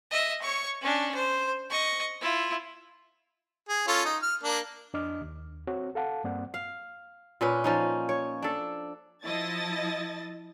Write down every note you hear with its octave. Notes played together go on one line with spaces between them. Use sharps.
D#5 E5
C#5 C#6
C#4 D4
C5
D#5 C#6
E4 F4
G#4
C#4 F4 A4
D#4
F6
A#3 D4
F2 D4 D#5 D6 F6
D#2
C4 F#4 C#5
A4 F5 F#5 A5
G2 A#3 C4 D5 F#5
F5
A#2 C#4 B4
F3 C#4 D#4
C#5
D4 A4
F3 E4 D#5 A5 A6